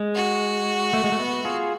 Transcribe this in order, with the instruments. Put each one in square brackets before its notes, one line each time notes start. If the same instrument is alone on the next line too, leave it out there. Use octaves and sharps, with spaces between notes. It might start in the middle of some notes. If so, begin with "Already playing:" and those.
Already playing: [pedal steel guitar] G#3
[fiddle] F#4
[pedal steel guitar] A3
G#3
A3
B3
F4 G#4